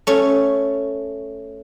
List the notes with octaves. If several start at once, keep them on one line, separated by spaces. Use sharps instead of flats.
A3 C#4